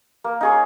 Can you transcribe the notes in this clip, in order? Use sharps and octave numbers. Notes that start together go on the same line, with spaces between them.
A#3
D#4 G#4 C#5